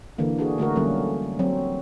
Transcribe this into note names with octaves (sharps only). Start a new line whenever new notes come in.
D3 E3 A#3
D4 F#4 G#4
D3 A3 F#4 A#4
D3 F#3 G3 A#3 C#4
F#3 C4